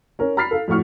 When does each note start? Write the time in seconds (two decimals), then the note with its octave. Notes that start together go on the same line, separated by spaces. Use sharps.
0.19 C#4 A#4
0.37 A#5 B5 F6 A6 B6 C7
0.51 A4 F5
0.68 F2 A2 F#4 C#6 F6